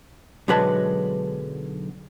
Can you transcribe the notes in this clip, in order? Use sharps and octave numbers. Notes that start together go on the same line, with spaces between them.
B1 D3 F#3 G#3 B4 A5